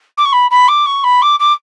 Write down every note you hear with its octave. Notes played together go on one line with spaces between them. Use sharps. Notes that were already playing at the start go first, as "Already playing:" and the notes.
D6
C#6
B5
B5
D6
C#6
B5
D6
D6